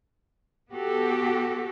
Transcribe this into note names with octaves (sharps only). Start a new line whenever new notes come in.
B3 F#4 G4 A4